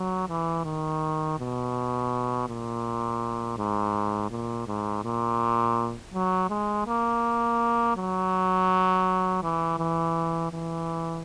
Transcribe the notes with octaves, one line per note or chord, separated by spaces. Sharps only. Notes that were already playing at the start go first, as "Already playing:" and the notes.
Already playing: F#3
E3
D#3
B2
A#2
G#2
A#2
G#2
A#2
F#3
G#3
A#3
F#3
E3
E3
E3